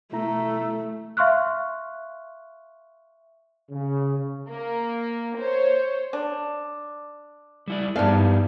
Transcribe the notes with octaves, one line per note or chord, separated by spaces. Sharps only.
B2 A3 E4 A#5
E5 F5 C6 C#6 F6 F#6
C#3
A#3
C5 C#5
D4
G3 E4 D5
G2 B3 D4 D#4 G4 F5 A5